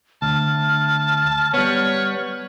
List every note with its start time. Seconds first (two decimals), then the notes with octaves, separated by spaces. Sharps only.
0.22 D2 A5 F6
1.54 G3 B3 C#5